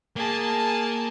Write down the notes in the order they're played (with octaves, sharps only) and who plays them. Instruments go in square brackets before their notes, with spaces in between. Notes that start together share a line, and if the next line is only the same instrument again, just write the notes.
[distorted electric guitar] A#3 [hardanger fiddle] G#4 A5